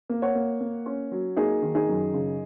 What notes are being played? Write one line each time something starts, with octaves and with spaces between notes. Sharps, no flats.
A#3
C#5 F#5
A#3
A#3
C#4
F#3
A#3 D#4 G#4
D#3
D#4 G#4
F#2
C#3